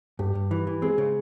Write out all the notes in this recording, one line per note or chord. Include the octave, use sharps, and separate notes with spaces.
G2 G3 G4
G2
E3
E3
G#3 C4 G#4
C#3